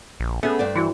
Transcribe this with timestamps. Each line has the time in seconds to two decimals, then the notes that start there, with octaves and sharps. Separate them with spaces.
0.20 A#1
0.43 A3 B3 C#4 G#4
0.59 G2 C5 D5
0.76 E3 E4 F#4